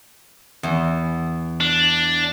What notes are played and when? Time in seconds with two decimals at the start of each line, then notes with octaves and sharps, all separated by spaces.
0.63 E2
1.60 D4